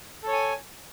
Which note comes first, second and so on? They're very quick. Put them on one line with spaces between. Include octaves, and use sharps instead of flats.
A4 C#5 G#5